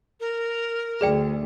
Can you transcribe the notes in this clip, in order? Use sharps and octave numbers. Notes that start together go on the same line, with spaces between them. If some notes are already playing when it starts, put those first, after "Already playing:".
A#4
D2 G#4 D5 G5